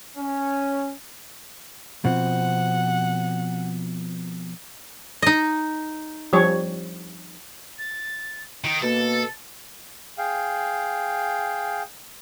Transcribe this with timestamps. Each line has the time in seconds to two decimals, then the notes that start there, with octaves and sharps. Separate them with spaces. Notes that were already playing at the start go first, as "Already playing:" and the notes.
0.17 C#4
2.05 B2 F3 C4 F#5
5.22 D#4 D#5
6.33 F3 G3 C#5
7.79 A6
8.64 D#3 D7
8.82 B2 A#3 A4 A6
10.18 G#4 F5 G5